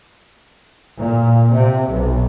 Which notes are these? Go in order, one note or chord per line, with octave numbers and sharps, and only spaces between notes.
A#2
C3
B1